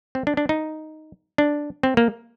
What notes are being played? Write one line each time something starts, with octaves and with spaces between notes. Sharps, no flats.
C4
D4
D4
D#4
D4
C4
A#3